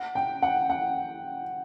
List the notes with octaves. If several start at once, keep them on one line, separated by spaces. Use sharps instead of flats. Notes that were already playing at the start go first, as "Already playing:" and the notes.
Already playing: F#5
G5
F#5
F#5